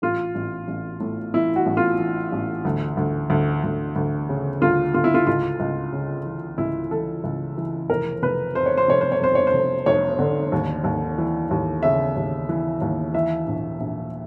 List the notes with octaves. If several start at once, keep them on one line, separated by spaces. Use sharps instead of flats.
A1 F4
A1
A1
A2
E3 E4
F#4
A1
F4
E3
A1
D2
D2
D2
D2
D2
C#3
D2 F4
D2 F4
E4
F4
C#2 F4
C#2
C#3
E3
C#2 E4
E3 A4
C#2
E3
F1 A#4
F1 B4
F2 C5
C#5
C5
F1 C#5
C5
C#5
F2 C5
C#5
C5
F1
F1 C#5
D3
D#2
D#2
E3
D#2
C#3 E5
D#2
E3
D#2
E3 E5
A#1
A#1